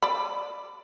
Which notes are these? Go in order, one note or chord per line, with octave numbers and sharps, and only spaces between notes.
D5 B5